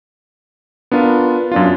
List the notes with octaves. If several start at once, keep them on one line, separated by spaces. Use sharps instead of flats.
B3 D4 F4 A#4
F#2 D4 F4